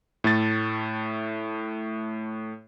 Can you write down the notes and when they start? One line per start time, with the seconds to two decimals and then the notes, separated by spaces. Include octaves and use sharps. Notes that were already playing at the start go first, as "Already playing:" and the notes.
0.24 A2 A3 A6